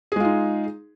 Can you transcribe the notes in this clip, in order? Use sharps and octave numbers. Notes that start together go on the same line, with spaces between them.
G#3 D#4 F4 G#4